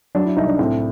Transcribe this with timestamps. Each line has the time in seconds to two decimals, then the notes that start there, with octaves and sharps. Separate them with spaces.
0.15 F#3 D4
0.25 E4
0.37 C2 D#4
0.48 D4
0.59 A2 C4